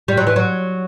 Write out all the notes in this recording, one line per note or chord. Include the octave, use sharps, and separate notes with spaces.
G3
F#3
E3
F#3